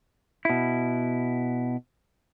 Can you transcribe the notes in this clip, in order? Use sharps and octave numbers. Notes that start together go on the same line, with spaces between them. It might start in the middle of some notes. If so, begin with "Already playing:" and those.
B2 E4